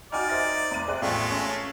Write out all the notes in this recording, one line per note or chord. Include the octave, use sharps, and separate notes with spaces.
D#4 F#4 D5 G#5 F6
C5 E5 A#6
F1 D#7
C3 G#4 D5 F#6
A1 E2 G#3 A3 F4
C#4